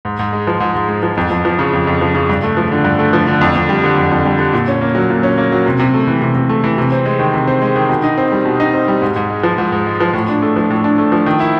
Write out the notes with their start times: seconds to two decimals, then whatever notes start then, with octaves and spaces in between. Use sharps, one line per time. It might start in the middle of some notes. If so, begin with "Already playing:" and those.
0.05 G#2
0.19 G#2
0.33 G#3
0.47 F3
0.60 G#2
0.75 G#2
0.88 G#3
1.03 F3
1.17 F2
1.31 F2
1.45 F3
1.59 C#3
1.73 F2
1.87 F2
2.01 F3
2.15 C#3
2.29 G2
2.43 A3
2.57 F3
2.72 D3
2.85 G2
2.99 A3
3.13 F3
3.27 D3
3.41 F2
3.55 F2
3.69 G3
3.84 D3
3.98 F2
4.11 F2
4.25 G3
4.39 D3
4.53 A#2
4.68 C#4
4.81 A#3
4.95 F#3
5.10 A#2
5.23 C#4
5.38 A#3
5.52 F#3
5.66 C3
5.80 C3
5.94 A3
6.07 E3
6.22 C3
6.35 C3
6.49 A3
6.64 E3
6.78 C3
6.92 C4
7.06 G#3
7.19 D#3
7.34 C3
7.47 C4
7.62 G#3
7.76 D#3
7.89 B2
8.04 D#4
8.18 C4
8.32 G3
8.45 B2
8.60 D#4
8.73 C4
8.88 G3
9.02 G#2
9.16 G#2
9.30 G#3
9.43 F3
9.58 G#2
9.72 G#2
9.86 G#3
10.01 F3
10.14 A2
10.28 D4
10.42 A3
10.56 F3
10.70 A2
10.84 D4
10.98 A3
11.12 F3
11.26 D#3
11.40 E4